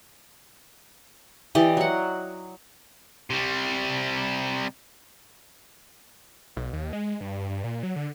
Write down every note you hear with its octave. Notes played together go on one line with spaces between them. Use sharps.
E3 G4 D5 D#5
F#3 F#5
C3 G3
B1
D#2
G#3
G2
G2
G2
A#2
F#3
D3